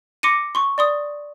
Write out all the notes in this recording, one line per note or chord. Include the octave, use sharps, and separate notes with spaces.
C6 D6 A#6 C#7 D#7
C6 C#6
D5 C6 D#6